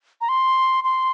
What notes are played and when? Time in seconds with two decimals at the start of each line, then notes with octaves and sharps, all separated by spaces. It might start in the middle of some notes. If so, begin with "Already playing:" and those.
0.21 A#5
0.29 C6
0.84 C6